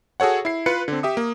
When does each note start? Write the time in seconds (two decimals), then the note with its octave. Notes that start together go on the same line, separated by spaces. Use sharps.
0.20 F#4 G#4 A4 C#5 F#5
0.45 E4 C7
0.66 F4 B4 C#7
0.88 D3 C4
1.03 G4 E5 D#6
1.17 A#3